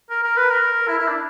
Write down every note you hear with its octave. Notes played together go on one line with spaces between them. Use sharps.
A#4
A#4
B4
A#4
E4
E4
D4